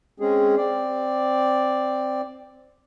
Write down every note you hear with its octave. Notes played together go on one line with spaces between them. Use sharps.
G#3 C4 C#4 G#4
C4 D5